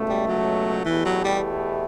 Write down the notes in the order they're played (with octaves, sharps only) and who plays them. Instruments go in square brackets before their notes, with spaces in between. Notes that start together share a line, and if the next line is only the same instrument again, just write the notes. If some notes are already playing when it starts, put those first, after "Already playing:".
Already playing: [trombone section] C#2 B2 A3
[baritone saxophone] G3
F#3
[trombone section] E2 B2 A3 E4 G4 [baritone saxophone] E3
[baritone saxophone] F#3
G3